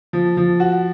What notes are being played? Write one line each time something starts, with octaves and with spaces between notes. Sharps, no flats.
F3
F3
F#4